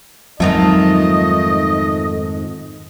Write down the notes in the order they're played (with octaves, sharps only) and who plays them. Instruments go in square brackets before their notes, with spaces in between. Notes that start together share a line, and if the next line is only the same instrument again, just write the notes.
[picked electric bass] F2 G#2 D#3 [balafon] F#3 [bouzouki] A3 F4 F5 [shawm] D#5